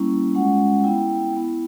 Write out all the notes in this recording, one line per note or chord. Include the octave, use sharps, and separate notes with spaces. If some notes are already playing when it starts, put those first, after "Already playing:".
Already playing: G3 A#3 C#4 E4
G#3 C#4 F4 F#5
B3 E4 G5
B3 E4